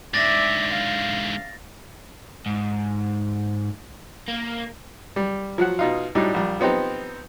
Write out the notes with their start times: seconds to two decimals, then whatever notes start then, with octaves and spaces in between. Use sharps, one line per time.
0.14 G#2 D3 D5 E5 A6 A#6
0.72 F5
2.46 G#2
4.28 A#3
5.16 G3
5.58 F3 F#3 F#5
5.79 B2 D#4 F4
6.15 A2 F#3 G3 D4 D#4
6.34 A#1 G3
6.60 F3 B3 C4 D#4 G4